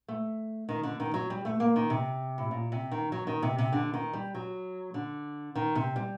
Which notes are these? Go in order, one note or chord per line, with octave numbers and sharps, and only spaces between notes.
A3
D#3
D3
D#3
F#3
G3
A3
A#3
D#3
C3
A2
A#2
C3
D#3
F#3
D#3
C3
C3
D3
D#3
G3
F#3
D3
D#3
C3
G3